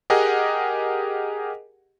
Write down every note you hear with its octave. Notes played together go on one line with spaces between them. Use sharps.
G4 G#4 A#4 D#5 F#5